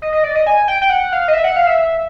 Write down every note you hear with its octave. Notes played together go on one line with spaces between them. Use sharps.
D#5
D#5
D5
D#5
G#5
G5
G5
F#5
F5
D#5
E5
F#5
F5
E5
E5